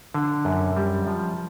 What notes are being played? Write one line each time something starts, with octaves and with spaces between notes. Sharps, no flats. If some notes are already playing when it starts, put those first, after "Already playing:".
D3
F#2
G3
F3